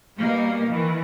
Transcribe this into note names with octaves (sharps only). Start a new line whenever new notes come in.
B2 G3 A#3 D#4
D#3 E3